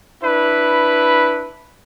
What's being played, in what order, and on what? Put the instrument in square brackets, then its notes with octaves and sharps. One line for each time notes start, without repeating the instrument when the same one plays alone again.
[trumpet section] D4 E4 B4